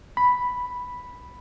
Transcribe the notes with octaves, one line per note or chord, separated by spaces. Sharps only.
B5